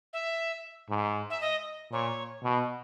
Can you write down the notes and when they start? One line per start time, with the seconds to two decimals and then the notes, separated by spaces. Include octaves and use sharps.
0.13 E5
0.90 G#2
1.30 E5
1.41 D#5
1.92 A#2 C#5
2.43 B2